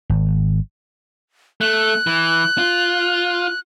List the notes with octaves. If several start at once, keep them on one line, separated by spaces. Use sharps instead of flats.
G#1
A3 F#6
E3
F4